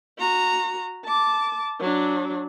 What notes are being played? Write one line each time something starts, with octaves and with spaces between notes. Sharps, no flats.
F#4 A#5
A5 D6
F#3 D4